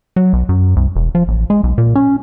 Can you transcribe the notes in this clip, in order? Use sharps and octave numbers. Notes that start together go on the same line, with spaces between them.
F#3
B1
F#2
C2
E1
F3
A1
G#3
B1
A#2
C#4